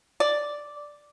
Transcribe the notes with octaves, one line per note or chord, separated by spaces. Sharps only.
D5